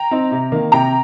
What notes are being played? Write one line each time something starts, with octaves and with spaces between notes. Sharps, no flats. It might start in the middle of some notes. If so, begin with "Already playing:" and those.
Already playing: G5 A#5
C4 D#4
C3
D#3 A#3
C3 G5 A#5